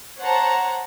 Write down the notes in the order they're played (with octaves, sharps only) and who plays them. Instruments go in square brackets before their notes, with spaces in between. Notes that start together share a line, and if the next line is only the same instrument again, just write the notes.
[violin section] C5 C#5 F#5 A5 A#5